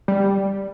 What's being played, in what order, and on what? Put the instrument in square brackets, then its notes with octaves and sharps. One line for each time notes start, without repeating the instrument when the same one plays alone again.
[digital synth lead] G3